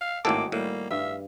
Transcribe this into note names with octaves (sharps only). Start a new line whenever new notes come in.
F5
G#1 A2 D#3 A#3 F#4 G#4 A4 D6
A2 G3 A#3
G2 E5 F5